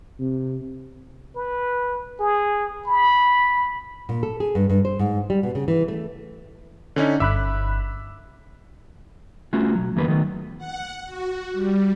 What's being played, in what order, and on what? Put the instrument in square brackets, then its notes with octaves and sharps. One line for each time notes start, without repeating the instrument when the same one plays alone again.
[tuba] C3
[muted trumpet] B4
G#4
B5
[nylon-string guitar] A#2
A4
G#4
G2
G2
C5
G#2
G3
B2
C#3
E3
A3
[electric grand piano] D3 C#4 D#4
[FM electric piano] G1 B5 F#6 [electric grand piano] E5 D6 E6
[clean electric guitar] A3 C#4 F4 F#4
B1 F#3
E2 D#3 F#3 A#3 B4
D#3 F#3 A3 B3
[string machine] F#5
F#4
G3